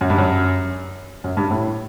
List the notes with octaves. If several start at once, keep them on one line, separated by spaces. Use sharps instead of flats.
F#2
G2
F#2
F#2
G2
A2